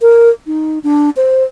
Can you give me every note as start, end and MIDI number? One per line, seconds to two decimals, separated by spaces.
0.02 0.30 70
0.47 0.79 63
0.84 1.10 62
1.17 1.44 72